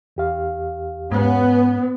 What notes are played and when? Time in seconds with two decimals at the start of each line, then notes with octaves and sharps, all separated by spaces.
0.16 E2 G4 F5
1.12 G#2 B3 C#4